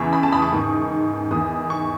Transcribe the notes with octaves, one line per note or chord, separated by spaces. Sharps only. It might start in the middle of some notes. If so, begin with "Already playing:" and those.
Already playing: E2 C#3 E3 C#6
B5
A5
B5
D#6
C#6
G#2 D#3
E2 D#3 D#6
C#6